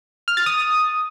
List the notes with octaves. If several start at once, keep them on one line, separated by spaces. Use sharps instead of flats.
F6
A6
D#6